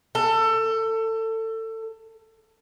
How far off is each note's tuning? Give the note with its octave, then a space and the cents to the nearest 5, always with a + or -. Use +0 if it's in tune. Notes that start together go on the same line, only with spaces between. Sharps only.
A4 +25